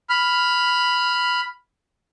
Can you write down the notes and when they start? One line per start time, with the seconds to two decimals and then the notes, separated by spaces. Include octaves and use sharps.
0.10 B5 F6